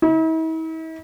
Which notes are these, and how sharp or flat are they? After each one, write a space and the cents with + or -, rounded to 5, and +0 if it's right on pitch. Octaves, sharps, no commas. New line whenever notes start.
E4 -45